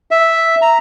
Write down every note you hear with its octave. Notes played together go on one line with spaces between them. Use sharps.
E5
A#5